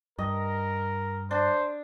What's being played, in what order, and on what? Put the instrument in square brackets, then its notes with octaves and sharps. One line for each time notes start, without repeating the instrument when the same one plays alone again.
[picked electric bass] G2 [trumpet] A#4 [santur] D#5
[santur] D4 [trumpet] C5